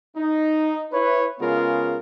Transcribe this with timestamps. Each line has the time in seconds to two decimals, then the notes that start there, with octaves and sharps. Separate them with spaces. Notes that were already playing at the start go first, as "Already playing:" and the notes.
0.17 D#4
0.93 E4 B4 C#5
1.40 C#3 G#3 B3 F4 G#4 A#4